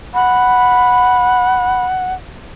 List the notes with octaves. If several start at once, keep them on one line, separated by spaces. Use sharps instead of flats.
F#5 B5